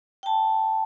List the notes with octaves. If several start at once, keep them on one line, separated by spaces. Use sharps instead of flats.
G5 A5